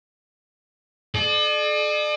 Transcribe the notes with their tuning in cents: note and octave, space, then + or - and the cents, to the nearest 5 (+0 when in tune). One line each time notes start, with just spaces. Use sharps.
A4 -45 D5 +40